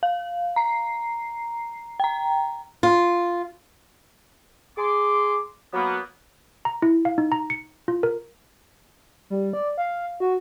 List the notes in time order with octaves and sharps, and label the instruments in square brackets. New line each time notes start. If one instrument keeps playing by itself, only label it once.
[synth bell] F5
A#5 C7
G5 A#5
[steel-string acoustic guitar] F4
[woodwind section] G#4 C6 D6
F#3 A#3 B3
[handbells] A#5
E4
F5
D#4
A#5
C#7
F4
A#4
[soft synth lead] G3
D5
F5
F#4